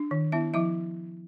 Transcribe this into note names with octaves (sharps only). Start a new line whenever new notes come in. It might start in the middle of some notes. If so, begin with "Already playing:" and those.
Already playing: D4
D#3
B3 E4 E5
F3 E4 E5